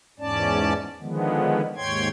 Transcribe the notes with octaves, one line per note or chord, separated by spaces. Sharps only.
E2 G#2 C#4 D5 A5
D3 D#3 F3 G#3 B3
D#2 G#2 C#5 G5 C6 G#6